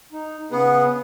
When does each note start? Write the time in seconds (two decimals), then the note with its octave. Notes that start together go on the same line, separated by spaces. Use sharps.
0.13 D#4
0.51 C#3 B3 G#4 F#5